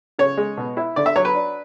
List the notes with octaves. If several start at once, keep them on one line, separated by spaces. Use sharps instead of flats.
C#3 C#5
G#3
B2
E4
D3 D5
E5
F#3 C#5
B4
D4